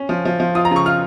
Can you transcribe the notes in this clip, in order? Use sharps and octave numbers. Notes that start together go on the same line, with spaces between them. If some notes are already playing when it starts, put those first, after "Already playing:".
Already playing: C#4
F3
F3
F3
F4 D#6
A#5
C#3 C#6
F4 F6